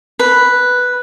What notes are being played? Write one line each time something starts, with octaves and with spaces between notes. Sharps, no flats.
B4